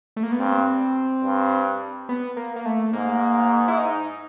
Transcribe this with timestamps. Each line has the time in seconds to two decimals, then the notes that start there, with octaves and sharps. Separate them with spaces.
0.16 A3
0.23 A#3
0.32 B3
0.39 G2 C4
1.24 G2
2.09 B3
2.37 A#3
2.56 A#3
2.65 A3
2.93 G#2 A#3
3.68 E4
3.78 D#4